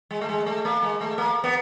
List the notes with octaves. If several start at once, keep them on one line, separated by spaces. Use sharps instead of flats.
G#3
A3
G#3
A3
A#3
G#3
A3
A#3
B3